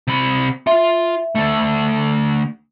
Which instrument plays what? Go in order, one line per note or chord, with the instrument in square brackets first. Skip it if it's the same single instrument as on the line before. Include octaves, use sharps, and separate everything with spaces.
[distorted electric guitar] C3 B5
[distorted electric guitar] F4 C6 [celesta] E5
[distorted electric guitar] D2 A3